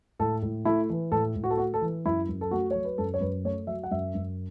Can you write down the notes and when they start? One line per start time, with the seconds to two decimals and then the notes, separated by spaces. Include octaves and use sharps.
0.19 A2 A4
0.42 A2
0.65 A3 E4
0.90 E3
1.12 A2 A4
1.36 A2
1.44 F#4
1.50 A4
1.57 A3 F#4
1.74 A4
1.81 E3
2.05 F#2 E4
2.29 F#2
2.41 A4
2.51 A3 F#4
2.71 F#3 C#5
2.85 B4
2.98 F#2 A4
3.14 C#5
3.21 F#2 B4
3.44 A3 C#5
3.67 F#3 E5
3.84 F#5
3.91 F#2 E5
4.15 F#2